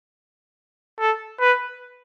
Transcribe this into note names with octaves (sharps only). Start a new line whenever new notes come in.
A4
B4